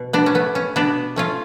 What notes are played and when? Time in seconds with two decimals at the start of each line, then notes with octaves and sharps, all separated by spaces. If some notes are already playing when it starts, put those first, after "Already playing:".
Already playing: B2
0.13 B3 D4
0.26 C#4
0.34 A3 B3
0.55 C#4
0.76 B2 B3 D4
1.16 A3 C#4 F4